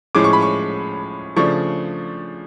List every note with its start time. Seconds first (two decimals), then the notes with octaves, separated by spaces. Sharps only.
0.15 A2 F3 G#3 C#4 D6
0.24 C#6
0.33 B5
0.42 C#6
1.36 C#3 F3 A3 D4 C#6